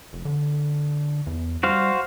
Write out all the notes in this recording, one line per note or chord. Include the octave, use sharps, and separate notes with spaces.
F1
D3
E2
G3 F#4 C5 F5